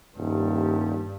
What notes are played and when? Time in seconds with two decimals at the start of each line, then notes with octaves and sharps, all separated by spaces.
0.18 D#1 G2